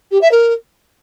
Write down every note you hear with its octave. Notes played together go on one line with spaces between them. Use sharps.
G4
E5
A#4